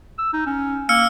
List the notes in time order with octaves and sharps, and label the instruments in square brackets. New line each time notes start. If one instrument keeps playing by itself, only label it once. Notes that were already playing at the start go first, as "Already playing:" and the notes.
[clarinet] E6
D#4
C#4
[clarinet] A#3 [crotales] E6 F6 C#7